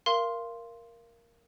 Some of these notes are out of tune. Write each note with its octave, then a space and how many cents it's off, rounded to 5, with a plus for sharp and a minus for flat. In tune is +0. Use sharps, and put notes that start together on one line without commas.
A#4 +0 F5 -25 C6 +0